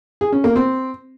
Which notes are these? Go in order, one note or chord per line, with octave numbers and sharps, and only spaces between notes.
G#4
C#4
A#3
C4